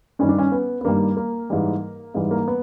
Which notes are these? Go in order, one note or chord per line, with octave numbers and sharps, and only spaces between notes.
G2 D#3 G3 C#4
D4
C#4
B3
B3
G2 D#3 G3 A#3
A#3
G#2 E3 G3
G#2 E3 G3
A#3
B3